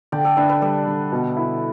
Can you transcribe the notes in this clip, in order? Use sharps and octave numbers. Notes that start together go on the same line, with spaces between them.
D3 D5 G5
A4 D5
D4 B4 E5
B4 E5
G3 A4 D5
D3
B2
E4